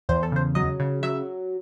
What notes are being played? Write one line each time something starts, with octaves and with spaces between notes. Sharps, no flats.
E2 C5
A4
C#3 C5
F#3 D#5
C#3
F#3 E5